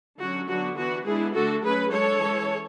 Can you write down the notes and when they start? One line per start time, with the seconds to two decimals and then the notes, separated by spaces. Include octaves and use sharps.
0.19 D3 F#3 C#4 F#4
0.48 D3 F#3 B3 D4 F#4
0.77 E3 B3 D4 F#4
1.06 G#3 B3 D4 E4 G#4
1.34 D3 A3 D4 F#4 A4
1.63 F#3 A3 C#4 G#4 B4
1.91 G#3 D4 A4 C#5
2.21 E3 G#3 C#4